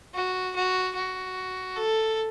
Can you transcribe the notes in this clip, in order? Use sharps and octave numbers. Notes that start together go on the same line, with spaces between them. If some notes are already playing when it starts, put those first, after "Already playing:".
F#4
F#4
F#4
A4